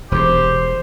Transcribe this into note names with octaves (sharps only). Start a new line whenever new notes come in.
E1 E2 G4 C5